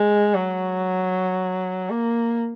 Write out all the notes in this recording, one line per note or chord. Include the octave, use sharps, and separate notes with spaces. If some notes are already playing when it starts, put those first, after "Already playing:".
Already playing: G#3
F#3
A#3